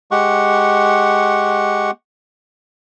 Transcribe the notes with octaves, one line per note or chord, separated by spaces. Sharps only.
G#3 G4 F#5 C#6